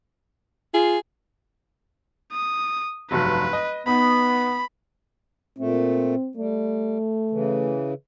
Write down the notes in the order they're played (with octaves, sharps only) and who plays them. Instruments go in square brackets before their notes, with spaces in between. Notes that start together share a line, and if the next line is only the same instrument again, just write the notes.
[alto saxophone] F4 [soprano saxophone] G#4
[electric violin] D#6
[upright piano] F1 G2 F#3 [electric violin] B4
[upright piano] D#5
[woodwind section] B3 [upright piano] D#4 [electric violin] B5
[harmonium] A#2 A3 [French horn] C4
[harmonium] G3 [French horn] A3
[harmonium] C#3 E3